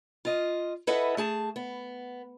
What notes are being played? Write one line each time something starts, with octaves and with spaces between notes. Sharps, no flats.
F4 D#5
E4 A4 B4 D#5 E5 F#5
A3 G#4 A5
B3